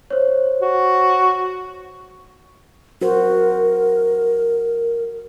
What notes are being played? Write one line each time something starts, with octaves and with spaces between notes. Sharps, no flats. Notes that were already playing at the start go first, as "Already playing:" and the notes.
C5 C#5
F#4
F#4 A#4 C5